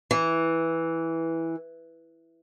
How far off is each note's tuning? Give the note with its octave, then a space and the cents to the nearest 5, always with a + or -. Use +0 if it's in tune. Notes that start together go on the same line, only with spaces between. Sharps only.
E3 -5